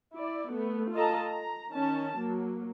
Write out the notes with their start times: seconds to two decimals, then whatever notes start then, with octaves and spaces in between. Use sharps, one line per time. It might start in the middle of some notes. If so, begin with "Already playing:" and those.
0.15 E4 D5
0.51 A3 B3
0.93 F4 A4 D#5 A5 A#5
1.25 A#5
1.70 D#3 C#4 A5
2.19 F#3 A#3